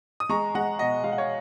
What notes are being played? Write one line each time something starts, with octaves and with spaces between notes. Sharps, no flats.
D#6
G#3 A#5 C#6
G#3 F#5 A#5
B2 D#5 F#5
G#3 F5
F#5
C#5 F5